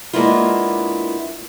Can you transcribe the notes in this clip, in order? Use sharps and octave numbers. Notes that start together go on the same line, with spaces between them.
G#3 A#3 B3 D4 E4 F4